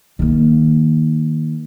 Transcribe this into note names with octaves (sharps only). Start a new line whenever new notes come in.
D#3 A#3